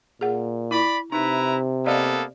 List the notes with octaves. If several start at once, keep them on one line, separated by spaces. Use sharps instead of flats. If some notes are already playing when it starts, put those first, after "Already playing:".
A#2 G#4 F#5
E4 D5 B5
C3 D#4 E4 B4 A#5
A#3 B3 A4 D5 D#5 F5